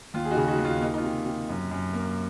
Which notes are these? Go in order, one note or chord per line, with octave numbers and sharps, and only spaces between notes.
D#2 F4
G#4
D#4 F#4
C#3
D#4 F#4
D#2
F4
A#3 D#4
D#4
F4
C3
C3
F#2
F#2
A#3